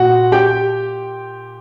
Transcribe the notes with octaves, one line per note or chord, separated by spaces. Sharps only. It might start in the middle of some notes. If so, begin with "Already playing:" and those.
Already playing: A#2 F#4 F#5
G4 G5